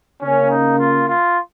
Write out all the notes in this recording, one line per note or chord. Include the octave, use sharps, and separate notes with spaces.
C#3 A#3 C#4
D#4
F4
F4